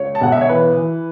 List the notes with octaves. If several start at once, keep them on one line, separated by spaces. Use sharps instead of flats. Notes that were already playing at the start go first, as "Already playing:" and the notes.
Already playing: C#2 C#5
A5
B1 F#5
E5
C#5
E3 B4
E3